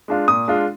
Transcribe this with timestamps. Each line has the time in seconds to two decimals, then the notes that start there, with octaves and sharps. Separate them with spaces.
0.08 G#3 D4 F4
0.28 A#2 D#6
0.48 G#3 D4 F4